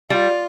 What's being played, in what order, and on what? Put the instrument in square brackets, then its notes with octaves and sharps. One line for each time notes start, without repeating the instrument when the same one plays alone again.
[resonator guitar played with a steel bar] G3 [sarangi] F4